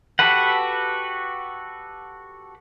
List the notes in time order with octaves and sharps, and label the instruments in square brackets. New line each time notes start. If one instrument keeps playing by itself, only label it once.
[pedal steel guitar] F#4 G4 A4 B4 F#5